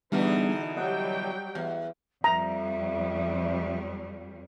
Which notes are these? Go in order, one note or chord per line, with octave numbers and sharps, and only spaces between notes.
B2 D3 E3 G3 B3 D4 D#4 G#4
F#3 G3 D#5 F#5 G5
E2
F2 G3 E5 A#5